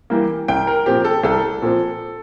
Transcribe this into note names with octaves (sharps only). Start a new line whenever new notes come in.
E3 G3 A#3
C2 G5
A#4
A#2 F3 C4 G4
A4
C2 A4
A#2 F3 C4